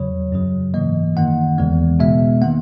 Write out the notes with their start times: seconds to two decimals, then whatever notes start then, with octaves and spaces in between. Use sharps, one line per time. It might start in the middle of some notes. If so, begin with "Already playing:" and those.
Already playing: E2 C#3 F#3 C#5
0.32 F#2 C#3 F#3
0.74 G#2 E3 A#3 D#5
1.16 F#2 D#3 A#3 F#5
1.58 E2 C#3 E3 G#3 B3
1.99 B2 G#3 B3 E5
2.42 D#3 A#3 F#5